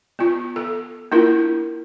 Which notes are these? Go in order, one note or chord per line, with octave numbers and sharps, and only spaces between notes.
B3 F4
A4
A#3 D4 E4 F4 A#4